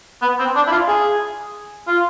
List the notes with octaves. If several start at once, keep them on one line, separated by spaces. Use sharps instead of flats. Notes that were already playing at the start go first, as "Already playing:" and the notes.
B3
C4
D4
E4
F4
G#4
F4